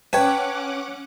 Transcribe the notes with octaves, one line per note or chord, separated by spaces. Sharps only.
C#4 B4 C#5 F#5 G5 A5 D6